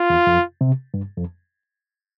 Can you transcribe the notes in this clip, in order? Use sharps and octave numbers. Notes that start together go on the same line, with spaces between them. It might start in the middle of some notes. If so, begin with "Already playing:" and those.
Already playing: F4
E2
F2
C3
G2
F2